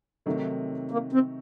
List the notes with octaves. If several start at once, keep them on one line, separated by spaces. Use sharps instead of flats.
C3 D#3 F#3 A3 D#4
A#3
C4